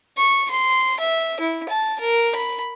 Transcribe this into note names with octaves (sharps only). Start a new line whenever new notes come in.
C#6
C6
E5
E4
A5
A#4
B5